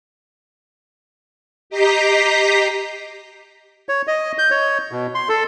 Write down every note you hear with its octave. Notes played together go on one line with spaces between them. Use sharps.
G4 D#5 A#5 B6 C7
C#5
D#5
G6
C#5
B2
C6
A4